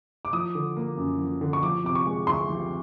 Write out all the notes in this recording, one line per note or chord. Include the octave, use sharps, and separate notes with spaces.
D6
F3 D#6
D3
A#3
F#2
F3
D3
C#6
F3 D6
C3 D6
C#6
G#3
D2 C6
F3